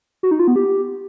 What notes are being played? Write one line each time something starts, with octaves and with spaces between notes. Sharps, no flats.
F#4
D#4
F4
B3
G4